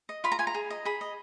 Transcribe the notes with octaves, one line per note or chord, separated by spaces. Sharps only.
D#5
F4 B5
A#5
F4 G#5
A#5
G#4
D#5
G#4 B5
D#5